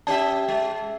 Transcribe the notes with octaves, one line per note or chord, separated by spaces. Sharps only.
C#4 G4 E5 A5
G#3 E5